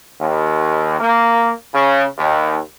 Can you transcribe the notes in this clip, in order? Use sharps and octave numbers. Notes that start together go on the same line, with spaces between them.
D#2
A#3
C#3
D#2